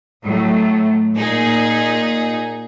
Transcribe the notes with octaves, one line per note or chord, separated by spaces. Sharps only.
A2 F#3 A3
A#2 D#4 G#4